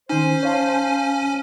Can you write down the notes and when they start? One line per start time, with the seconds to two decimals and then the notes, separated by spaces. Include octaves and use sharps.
0.09 D#3 C#4 D#4 C5 G#5
0.43 C#5 F5 A5